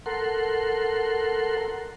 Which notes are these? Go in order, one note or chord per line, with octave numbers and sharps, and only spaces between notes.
A4 A#4 F#5 C6